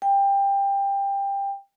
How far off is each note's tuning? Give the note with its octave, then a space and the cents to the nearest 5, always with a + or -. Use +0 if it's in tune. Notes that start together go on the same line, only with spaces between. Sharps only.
G5 +20